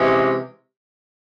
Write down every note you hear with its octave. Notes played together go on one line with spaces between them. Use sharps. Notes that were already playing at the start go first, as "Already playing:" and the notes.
Already playing: C3 E3 G#3 C#4